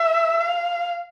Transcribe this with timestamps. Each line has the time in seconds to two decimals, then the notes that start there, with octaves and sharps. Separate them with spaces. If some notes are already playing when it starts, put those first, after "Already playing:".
Already playing: E5
0.40 F5